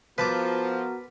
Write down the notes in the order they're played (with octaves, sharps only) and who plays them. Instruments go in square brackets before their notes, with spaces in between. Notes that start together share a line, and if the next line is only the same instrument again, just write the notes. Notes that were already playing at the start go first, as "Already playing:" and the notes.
[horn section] F3 [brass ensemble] B3 F#4 A#4 [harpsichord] B4 A5 D6